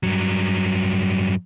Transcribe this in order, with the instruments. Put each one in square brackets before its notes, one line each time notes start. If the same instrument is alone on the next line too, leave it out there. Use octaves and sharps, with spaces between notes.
[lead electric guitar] G2 F#3